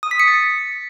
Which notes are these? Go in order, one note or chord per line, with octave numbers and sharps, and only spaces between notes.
D#6
B6
C#7
A6